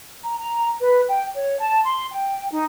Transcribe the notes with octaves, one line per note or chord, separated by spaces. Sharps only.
A#5
A#5
B4
G5
C#5
A5
C6
G5
D#4